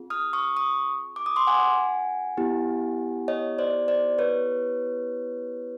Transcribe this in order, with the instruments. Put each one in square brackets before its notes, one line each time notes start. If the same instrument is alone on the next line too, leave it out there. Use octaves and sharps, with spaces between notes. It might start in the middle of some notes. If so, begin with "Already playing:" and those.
Already playing: [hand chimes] C4 F4 G#4
D#6 F6
C#6 D#6
C#6 D#6
D6
D#6
C6 D6
F#5 G#5
B3 E4 G4
C#5 D#5
C5 D5
C5 D5
B4 C#5